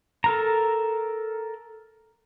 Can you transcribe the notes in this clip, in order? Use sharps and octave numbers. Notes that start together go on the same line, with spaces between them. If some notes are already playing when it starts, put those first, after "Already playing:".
A4 A#4 A#5